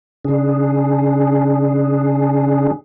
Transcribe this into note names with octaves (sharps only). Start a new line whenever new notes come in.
C#3 D4 G#4